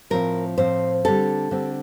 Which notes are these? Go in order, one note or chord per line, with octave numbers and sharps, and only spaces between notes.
A2 F3 C4 A#4
A2 F3 C4 C5
D3 G3 C4 A4
D3 G3 C4